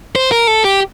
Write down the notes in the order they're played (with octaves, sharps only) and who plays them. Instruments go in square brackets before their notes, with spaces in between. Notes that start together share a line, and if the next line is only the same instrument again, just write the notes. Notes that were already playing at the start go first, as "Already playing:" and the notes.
[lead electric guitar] C5
A#4
A4
G4